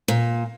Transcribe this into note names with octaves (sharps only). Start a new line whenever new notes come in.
A#2